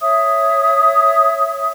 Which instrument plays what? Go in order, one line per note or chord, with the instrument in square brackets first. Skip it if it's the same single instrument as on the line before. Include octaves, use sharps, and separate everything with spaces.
[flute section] C#5 E5 D#6